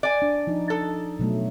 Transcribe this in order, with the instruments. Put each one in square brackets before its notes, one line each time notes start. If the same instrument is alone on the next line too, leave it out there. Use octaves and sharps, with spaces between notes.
[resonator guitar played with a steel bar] D5 G#5
[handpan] D4
F3 D#4
[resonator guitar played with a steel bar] A4
[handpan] B2 F#3 A3